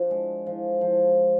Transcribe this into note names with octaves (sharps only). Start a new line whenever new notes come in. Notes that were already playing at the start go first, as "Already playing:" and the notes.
Already playing: F3 D4
G#3
F3
F3